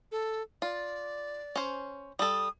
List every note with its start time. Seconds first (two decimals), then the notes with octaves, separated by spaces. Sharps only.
0.12 A4
0.62 F4 D5
1.56 C#4 C5
2.19 G3 A4 D#6